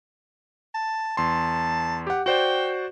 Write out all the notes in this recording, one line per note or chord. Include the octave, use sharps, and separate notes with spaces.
A5
E2 A5 C6
G4 F#5
F#4 C5 D5 G5